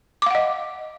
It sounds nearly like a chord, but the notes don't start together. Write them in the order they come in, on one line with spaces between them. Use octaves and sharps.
D6 F5 F#5 D#5